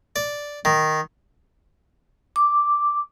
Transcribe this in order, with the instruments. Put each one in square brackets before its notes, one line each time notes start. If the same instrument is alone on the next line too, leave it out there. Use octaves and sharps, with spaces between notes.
[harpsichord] D5
D#3
[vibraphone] D6